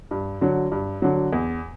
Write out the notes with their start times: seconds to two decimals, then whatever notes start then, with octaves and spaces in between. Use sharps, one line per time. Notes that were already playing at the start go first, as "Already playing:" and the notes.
0.11 G2
0.41 D3 F#3
0.72 G2
1.02 D3 F#3
1.33 E2